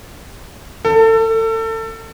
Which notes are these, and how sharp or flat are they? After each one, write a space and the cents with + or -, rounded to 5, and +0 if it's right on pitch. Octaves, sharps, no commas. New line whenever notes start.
A4 +30